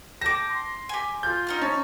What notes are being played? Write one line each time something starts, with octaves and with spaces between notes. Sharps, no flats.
G5 A5 D6 A#6
C6
G4 G#5
F4 G6
D#4 A#5 F6
C#4 A5